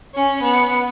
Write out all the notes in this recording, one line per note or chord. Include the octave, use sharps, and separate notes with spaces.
C#4
B3